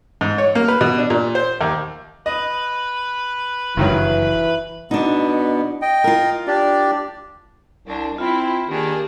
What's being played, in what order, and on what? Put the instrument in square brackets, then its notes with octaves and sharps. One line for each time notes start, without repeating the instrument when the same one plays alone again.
[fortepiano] G#2
C#5
A#3
B4
B2
D4
A#2
C5
D#2
[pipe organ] B4 B5 [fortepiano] D#5
[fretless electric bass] F#1 [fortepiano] G2 D#3 F#3 [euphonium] E3
[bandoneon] B2 B3 [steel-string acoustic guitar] D4 D#4
[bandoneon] D#5 G5
[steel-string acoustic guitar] F4 A#4
[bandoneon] D4 G4 D5
[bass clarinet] C2 [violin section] D4
[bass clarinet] C4 [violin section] E4 [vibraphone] F4
[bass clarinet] D#3 [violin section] A#3 D4 G#4 [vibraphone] G4